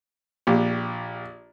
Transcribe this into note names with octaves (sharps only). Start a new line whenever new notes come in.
A#1 G4